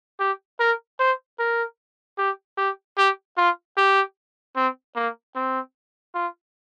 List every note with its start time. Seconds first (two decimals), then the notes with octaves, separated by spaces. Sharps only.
0.20 G4
0.59 A#4
0.99 C5
1.39 A#4
2.18 G4
2.57 G4
2.97 G4
3.37 F4
3.77 G4
4.56 C4
4.96 A#3
5.36 C4
6.15 F4